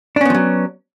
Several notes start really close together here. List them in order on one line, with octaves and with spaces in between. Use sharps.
D4 C#4 B3 F3 F#3